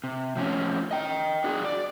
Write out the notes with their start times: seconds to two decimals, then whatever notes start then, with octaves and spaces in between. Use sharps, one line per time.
0.04 C3
0.36 A2 F3 C4 C#4
0.91 D#5 G5
1.44 D4 F#4 G#4
1.64 D5